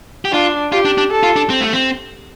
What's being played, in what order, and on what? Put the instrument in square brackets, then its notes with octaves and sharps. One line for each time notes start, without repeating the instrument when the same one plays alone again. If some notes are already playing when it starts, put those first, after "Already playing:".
[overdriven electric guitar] G4
[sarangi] D4 [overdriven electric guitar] F4
[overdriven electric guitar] F4 [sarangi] G4
[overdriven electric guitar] D4
D4
[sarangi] A4
[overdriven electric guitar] F4
D4
C4
A3
C4